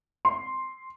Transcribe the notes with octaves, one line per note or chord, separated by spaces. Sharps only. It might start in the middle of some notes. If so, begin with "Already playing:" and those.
C6